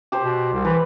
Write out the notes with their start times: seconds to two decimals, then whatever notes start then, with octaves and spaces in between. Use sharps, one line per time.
0.12 G4 C5
0.23 B2
0.53 C2
0.65 E3 B4